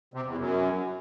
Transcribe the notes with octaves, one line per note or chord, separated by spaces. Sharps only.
C3
E2
F#2